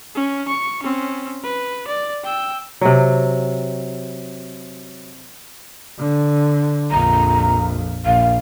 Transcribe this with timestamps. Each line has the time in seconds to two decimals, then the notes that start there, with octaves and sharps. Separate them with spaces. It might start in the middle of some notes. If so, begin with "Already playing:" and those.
0.15 C#4
0.48 C#6
0.83 C4 C#4
1.43 B4
1.88 D5
2.24 G5 E6
2.81 C3 F#3
5.99 D3
6.91 A#1 F2 A#5
8.06 A#1 F5